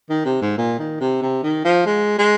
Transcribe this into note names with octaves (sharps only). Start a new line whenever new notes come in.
D#3
C3
G#2
A#2
D#3
C3
C3
D#3
F3
G#3
G#3